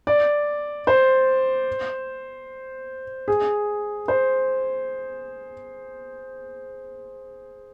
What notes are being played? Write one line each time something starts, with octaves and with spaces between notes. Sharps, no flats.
D5
C5
G#4
C5